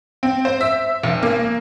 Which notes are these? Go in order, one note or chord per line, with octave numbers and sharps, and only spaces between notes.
C4
C5
E5
F1
A#3